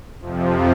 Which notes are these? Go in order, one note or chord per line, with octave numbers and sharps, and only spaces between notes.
F2 C3 F3